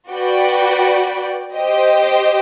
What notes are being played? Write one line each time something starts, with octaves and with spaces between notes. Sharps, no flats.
F#4 B4 D5 G5
G4 C5 D#5 G5